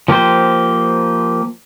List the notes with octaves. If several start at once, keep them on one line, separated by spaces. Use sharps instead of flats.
F3 A#3 G4 C5